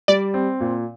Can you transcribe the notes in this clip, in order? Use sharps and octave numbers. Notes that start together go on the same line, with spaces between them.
G3 D5
C4
A#2